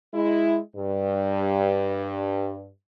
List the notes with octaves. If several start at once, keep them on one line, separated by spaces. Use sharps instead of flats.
G#3 E4
G2